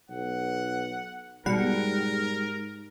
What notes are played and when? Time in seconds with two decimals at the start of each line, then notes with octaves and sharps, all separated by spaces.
0.10 B1 F#5
1.46 G#2 B2 G3 A#4 F#5